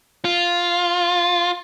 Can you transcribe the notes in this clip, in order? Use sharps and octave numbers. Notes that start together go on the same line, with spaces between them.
F4